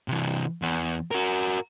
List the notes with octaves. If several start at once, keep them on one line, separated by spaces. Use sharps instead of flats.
C3 E3
E2
F#4 A#4